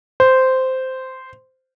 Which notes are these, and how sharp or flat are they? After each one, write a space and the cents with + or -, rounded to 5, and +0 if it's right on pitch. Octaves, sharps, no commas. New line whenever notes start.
C5 -10